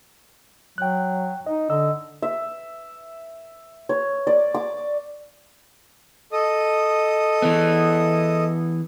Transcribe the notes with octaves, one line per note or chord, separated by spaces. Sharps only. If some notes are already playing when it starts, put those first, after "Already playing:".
F#3 G5 F#6
D#4 D#5
D3 D#5 E6
E5
C#5
D5
D6
A4 D#5 D#6
E3 B3